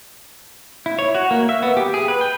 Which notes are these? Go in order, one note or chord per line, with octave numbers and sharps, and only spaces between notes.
E4
C#5
F#4
A#3
E5
B3
G4
G#4
B4
G5